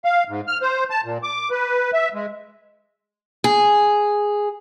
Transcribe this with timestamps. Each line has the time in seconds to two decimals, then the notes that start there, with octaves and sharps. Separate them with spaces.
0.05 F5
0.29 G#2
0.48 F6
0.62 C5
0.90 A5
1.05 A#2
1.23 D6
1.51 B4
1.93 E5
2.14 G#3
3.44 G#4